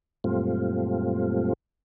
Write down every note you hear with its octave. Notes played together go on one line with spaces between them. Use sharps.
F#2 A#2 G3 A3 C4 F4